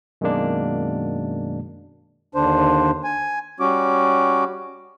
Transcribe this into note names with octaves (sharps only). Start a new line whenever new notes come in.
F#2 B2 D#3 G#3 A#3 D4
D#2 D3 D4 C5
G#5
G3 C#4 F#4 D6